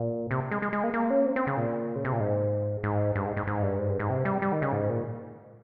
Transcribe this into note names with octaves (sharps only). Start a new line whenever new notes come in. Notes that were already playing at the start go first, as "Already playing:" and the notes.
Already playing: A#2
C3
G#3
G#3
G#3
A#3
A#3
C#4
C4
C4
C#3
A#2
C#3
C3
A#2
G#2
G#2
G2
G#2
G#2
G#2
G2
G#2
G2
G#2
C3
G3
G3
D#3
C#3
G#2
A#2